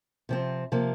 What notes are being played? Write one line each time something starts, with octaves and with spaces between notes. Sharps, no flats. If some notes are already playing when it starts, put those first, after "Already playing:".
C3 F3 C4
C3 F3 A#3